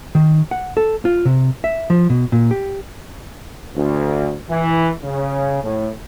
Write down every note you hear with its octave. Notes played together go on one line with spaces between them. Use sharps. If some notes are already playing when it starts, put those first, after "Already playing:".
D#3
F#5
A4
F4
C3
E5
F3
B2
A#2
G4
D2
E3
C#3
A2